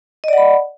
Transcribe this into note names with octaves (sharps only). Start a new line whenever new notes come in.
D5 D#5 F#5 B5